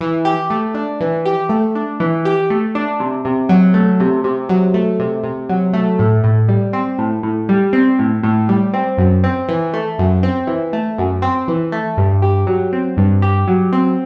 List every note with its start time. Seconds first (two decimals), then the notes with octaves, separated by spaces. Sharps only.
0.01 E3
0.25 G4
0.50 A3
0.74 D4
1.01 E3
1.25 G4
1.49 A3
1.75 D4
2.00 E3
2.25 G4
2.50 A3
2.75 D4
3.00 C3
3.25 C3
3.49 F#3
3.74 A3
4.00 C3
4.24 C3
4.49 F#3
4.74 A3
4.99 C3
5.24 C3
5.49 F#3
5.73 A3
5.99 A2
6.24 A2
6.49 G3
6.73 C4
6.98 A2
7.23 A2
7.49 G3
7.73 C4
7.99 A2
8.23 A2
8.49 G3
8.73 C4
8.98 F#2
9.24 C4
9.49 E3
9.74 A3
9.99 F#2
10.23 C4
10.47 E3
10.73 A3
10.98 F#2
11.22 C4
11.48 E3
11.72 A3
11.97 G2
12.22 G4
12.47 F#3
12.73 C4
12.97 G2
13.22 G4
13.48 F#3
13.72 C4